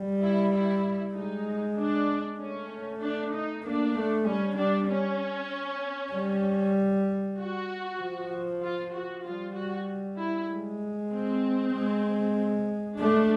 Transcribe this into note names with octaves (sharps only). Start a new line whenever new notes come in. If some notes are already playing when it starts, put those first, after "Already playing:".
Already playing: G3
E4
E4
G#3 D#4
D4
A3 C#4
D4
D#4
A#3 D4
A3
G3 C#4
G3 D4
C#4
G3
F#4
F3
F4
F#4
G3 F4
F#4
E4
G#3
C4
G#3
A3 D4